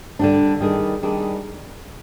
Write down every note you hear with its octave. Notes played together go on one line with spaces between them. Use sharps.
D3 G3 D4
D#3 G3 D4 G#4
D#3 G3 D4 G#4